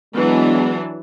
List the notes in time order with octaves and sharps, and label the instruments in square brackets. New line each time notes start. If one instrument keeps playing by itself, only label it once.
[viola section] E3 F#3 D4 [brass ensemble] G#3 B3